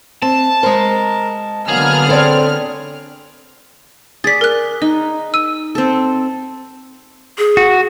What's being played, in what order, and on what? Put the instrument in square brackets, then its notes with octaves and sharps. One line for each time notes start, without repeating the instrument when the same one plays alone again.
[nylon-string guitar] C4 [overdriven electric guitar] A5
[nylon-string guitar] G#3 C5 [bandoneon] A#4
[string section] D3 B3 F6 [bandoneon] F#3 A#3 [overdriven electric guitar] G#4
[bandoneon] C4 [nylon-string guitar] A4 C#5 D5
[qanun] G#4 D5 [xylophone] A6 B6
[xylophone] A#4 F#6
[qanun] D#4 [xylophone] D#5
[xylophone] E6 D#7
[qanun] C4 A4
[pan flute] G#4
[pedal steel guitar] F#4